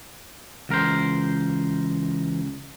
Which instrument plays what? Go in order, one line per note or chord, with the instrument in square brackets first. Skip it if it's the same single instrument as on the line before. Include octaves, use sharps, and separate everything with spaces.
[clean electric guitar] C#2 A#4 C5 [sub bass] E3